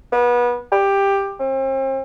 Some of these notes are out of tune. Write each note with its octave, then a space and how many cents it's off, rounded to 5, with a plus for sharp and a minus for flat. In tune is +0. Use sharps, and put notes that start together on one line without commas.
B3 -30
G4 +10
C4 +40